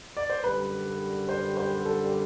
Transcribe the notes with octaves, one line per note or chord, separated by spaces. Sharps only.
D5
C5
F#2 D3 G3 B4
C5
C5
A4